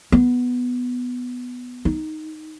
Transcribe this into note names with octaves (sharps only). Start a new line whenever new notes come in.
B3
D#4